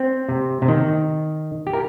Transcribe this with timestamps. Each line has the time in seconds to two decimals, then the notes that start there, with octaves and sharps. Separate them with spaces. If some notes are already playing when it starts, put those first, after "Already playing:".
Already playing: C4
0.29 C3
0.62 C3
0.68 D#3
1.67 G4
1.73 A#4